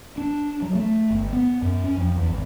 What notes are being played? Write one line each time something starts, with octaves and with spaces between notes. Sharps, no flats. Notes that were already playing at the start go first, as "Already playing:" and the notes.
D4
F#3
A3
G1
B3
F#2
C#4
F2
E2
G#1